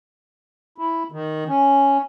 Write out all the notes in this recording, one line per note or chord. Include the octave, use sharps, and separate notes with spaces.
E4
D#3
C#4